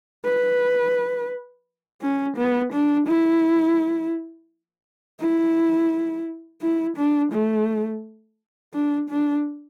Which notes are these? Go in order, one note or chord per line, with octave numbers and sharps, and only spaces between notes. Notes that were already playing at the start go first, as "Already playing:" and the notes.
B4
C#4
B3
D4
E4
E4
E4
D4
A3
D4
D4